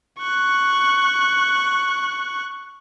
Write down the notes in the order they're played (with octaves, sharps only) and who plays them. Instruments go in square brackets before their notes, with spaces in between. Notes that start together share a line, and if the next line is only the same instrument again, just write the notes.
[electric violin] C#6 F#6